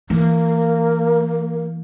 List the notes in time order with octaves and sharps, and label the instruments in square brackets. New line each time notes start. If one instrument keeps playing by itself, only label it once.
[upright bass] E3 [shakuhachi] A#3